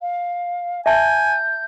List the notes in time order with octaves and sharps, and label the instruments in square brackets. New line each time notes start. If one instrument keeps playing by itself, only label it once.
[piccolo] F5
[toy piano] E5 A5 [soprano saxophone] G#5 [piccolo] G6